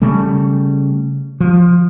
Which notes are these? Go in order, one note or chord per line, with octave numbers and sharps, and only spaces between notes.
C#3 G3 A3
F3